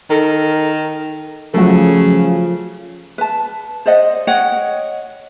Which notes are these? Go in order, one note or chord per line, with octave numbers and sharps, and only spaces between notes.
D#3 A4 A#4
C#3 F3 F#3 A3 A4
B4 A5
C5 D5 D#5 F#5
C#5 D#5 F#5 G5